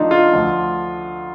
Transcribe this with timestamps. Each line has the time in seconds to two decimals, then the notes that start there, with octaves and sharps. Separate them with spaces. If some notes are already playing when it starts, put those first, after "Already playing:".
Already playing: D2 D3 F3 D4 D#4 F4
0.11 F4
0.33 D2 D3 F3